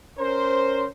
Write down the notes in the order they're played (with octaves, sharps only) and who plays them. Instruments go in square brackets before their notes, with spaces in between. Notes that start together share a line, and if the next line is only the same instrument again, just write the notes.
[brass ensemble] C#4 A#4 C5